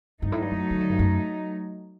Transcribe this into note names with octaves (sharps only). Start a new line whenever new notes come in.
G2 F#3 A3 D#4
A2
G2
F#2
D#3
D3
G2
F#2